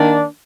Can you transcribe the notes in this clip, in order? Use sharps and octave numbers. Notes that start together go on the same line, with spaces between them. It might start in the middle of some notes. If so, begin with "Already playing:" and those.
Already playing: D#3 A#3 D4